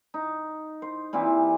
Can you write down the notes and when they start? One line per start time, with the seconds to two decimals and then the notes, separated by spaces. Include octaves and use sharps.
0.14 D#4
0.82 C5
1.13 A#2 E3 C4 G4